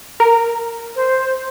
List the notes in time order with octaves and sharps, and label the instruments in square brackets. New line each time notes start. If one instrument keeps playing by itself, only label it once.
[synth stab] A#4
[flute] C5